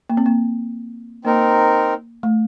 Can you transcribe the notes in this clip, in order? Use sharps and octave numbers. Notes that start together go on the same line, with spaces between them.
A#3
C4
A#3
A#3 C4 D#4 A#4
A3